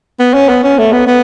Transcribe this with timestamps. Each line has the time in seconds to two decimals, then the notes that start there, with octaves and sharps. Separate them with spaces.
0.20 B3
0.34 C#4
0.49 B3
0.64 C#4
0.79 A3
0.93 B3
1.07 B3